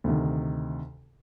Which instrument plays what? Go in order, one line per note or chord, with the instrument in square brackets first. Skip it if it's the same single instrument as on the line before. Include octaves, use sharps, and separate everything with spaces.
[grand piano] D2 C3 D#3